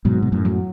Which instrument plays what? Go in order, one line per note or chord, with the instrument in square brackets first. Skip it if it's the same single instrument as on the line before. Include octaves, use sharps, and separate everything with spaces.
[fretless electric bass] G#2 B2 [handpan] F#3
[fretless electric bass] B2
F#2 A2
[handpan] F#3